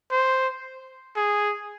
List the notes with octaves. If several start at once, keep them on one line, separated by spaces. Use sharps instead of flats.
C5
G#4